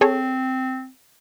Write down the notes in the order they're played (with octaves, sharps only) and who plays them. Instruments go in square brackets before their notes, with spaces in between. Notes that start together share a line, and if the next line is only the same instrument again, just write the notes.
[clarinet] C4 [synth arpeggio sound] G#4 A4 C#5